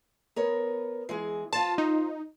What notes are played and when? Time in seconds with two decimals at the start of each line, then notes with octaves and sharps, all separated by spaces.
0.36 B3 A#4 C#5
1.09 E3 G#3 G#4
1.53 F4 C5 A5
1.78 D#4